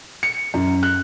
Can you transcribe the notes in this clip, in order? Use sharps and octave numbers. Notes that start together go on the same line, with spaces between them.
C#7
F#2
F#6